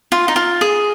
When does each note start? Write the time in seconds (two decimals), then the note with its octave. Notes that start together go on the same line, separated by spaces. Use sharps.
0.12 F4
0.28 D#4
0.36 F4
0.61 G#4